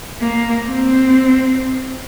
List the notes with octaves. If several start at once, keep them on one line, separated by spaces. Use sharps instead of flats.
A#3
C4